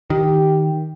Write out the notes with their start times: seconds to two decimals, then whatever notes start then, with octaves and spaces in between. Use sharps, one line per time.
0.10 D#3 G4